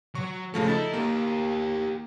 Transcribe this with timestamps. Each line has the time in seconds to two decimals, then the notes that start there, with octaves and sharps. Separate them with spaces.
0.15 F#3 C#6
0.54 A2 C#3 F3 A3
0.68 D#4 E4 A4 A6
0.93 A#3 G4 A#4